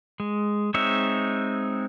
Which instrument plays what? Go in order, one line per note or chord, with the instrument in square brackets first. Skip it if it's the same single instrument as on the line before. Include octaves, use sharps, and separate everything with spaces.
[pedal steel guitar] G#3
G#3 C4 D#4 C#5 E5